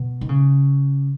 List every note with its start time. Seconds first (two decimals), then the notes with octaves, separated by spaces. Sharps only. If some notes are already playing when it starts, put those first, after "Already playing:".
Already playing: B2
0.21 D#3
0.29 C#3